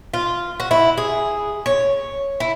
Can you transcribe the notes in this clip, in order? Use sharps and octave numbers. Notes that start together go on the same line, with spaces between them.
F4
F#4
E4
G#4
C#5
E4